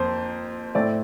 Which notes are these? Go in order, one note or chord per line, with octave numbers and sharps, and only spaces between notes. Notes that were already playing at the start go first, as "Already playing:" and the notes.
Already playing: F2 A#3 C5
A2 A3 C4 D5